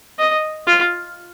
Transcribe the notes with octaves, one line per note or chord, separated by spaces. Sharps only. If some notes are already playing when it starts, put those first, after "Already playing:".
D#5
F4